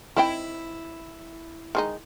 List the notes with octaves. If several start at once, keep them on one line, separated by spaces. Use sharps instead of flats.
D#3 C4 E4 G5
D#3 G#3 D#4